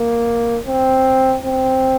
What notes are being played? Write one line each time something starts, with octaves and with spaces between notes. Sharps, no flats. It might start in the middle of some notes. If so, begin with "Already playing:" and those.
Already playing: A#3
C4
C4